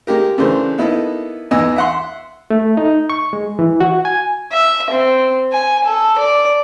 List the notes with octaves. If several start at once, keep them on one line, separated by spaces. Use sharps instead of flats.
G#3 A#3 G4 A#4
C#3 E3 A3 D4 A#4 C5
A#3 B3 D#4 E4 A4
E2 B3 D#4 D#5 G#5 E6
E5 F#5 C6
A3
D#4
C#6
G#3
E3
F#4
G#5
E5
C4
G#5
A4
D5